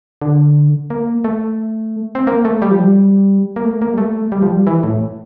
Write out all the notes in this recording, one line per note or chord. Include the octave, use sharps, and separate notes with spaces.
D3
A#3
A3
C4
A#3
A3
G3
F3
G3
A#3
A3
A#3
G3
A3
G3
F3
G3
E3
A2